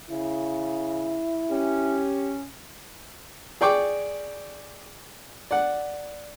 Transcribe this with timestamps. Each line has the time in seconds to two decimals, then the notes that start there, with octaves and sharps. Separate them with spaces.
0.11 C#3 E4
1.50 C#4 G4
3.61 G#4 D5 G5 C#6 D6
5.51 D5 F#5